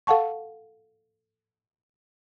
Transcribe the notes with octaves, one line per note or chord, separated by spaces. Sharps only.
A4 F5 F#5 A5 C#6